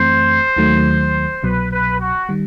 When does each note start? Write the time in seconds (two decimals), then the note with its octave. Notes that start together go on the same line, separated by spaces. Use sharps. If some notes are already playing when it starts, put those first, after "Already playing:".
Already playing: F#2 E3 A3 C4 C5
0.56 D#2 D#3 F#3 A3
1.43 C2 B2 F#3 B4
1.71 B4
1.99 F#4
2.29 D#3 G3